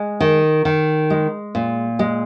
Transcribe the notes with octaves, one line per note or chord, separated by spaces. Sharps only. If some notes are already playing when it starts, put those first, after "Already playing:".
Already playing: G#3
D#3
D#3
G#3
A#2
G#3